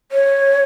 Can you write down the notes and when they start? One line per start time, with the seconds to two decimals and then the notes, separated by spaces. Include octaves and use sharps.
0.12 C#5